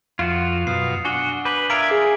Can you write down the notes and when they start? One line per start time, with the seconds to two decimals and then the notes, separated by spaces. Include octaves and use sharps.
0.19 F2 F4 F#4
0.67 F#2 B2 F5 D#6 C7
1.05 D4 F#4 G#5 G7
1.45 B4 D6 G6 F#7
1.70 F4 A#4 E5 A#5 G#6 B6 D7
1.91 G#4